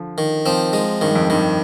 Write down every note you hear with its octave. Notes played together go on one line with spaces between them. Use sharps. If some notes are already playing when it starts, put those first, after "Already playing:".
Already playing: D3 F3
D#3
F3 C4
G#3
G2 D#3
F2
G2 D#3